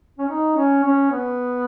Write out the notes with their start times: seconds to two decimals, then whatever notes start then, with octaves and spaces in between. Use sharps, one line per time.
0.19 C#4
0.29 D#4
0.56 C#4
0.84 C#4
1.11 B3